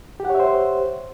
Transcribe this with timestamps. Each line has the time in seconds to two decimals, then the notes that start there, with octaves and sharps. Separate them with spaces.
0.20 G4
0.25 F#5
0.30 C#5
0.35 E5
0.40 C5